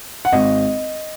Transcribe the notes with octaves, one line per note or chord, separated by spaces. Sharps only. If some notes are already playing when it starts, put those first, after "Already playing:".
F#5
G#1 D#5